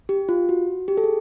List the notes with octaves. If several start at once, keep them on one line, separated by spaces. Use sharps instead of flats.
G4
F4
F#4
G4
A4
G#4